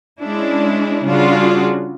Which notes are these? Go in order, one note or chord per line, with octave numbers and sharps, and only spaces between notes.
G#3 C#4 D4 E4
C#3 G3 D4 F4 F#4 G#4